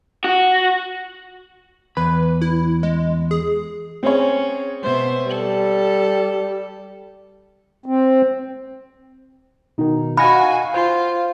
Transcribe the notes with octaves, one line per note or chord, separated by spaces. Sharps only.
F#4
E2 B4 B5
E4
G#3
G#4
C4 C#4 G#4 C#5
B2 C5 E5
G3 A4
C4
B2 D#3 D#4
F#4 D#5 F5 F#5 G#5 B5 A#6
F4 C5 C6